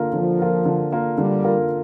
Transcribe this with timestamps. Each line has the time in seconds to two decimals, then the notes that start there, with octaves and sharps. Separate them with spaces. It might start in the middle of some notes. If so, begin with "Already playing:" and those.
Already playing: D3 A#3 F4 A#4
0.13 D3 F3
0.39 A#3 F4 A#4
0.65 D3
0.92 A#3 F4 A#4
1.18 D3 G3
1.44 A#3 F4 A#4